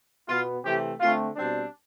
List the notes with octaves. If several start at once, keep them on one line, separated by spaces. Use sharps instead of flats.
B2 B3 F4
C3 E3 A3 C4 G4
D3 A3 C4 F4
B2 G3 C4 D4